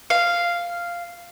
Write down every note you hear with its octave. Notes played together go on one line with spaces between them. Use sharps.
F5